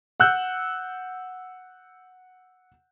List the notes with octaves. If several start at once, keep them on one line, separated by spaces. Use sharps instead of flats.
F#5 E6 F#6 G6